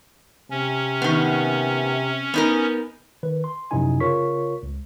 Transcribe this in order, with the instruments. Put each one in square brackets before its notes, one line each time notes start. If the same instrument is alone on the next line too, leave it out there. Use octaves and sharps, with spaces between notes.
[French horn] C3 [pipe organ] C#4
[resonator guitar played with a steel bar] D#3 B3
B3 D#4 A#4
[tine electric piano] D#3 B4
C6
F#2 C3 F3 D#4 E4 G#5
C#3 F4 A#4 C#5 C#6 B6
C#2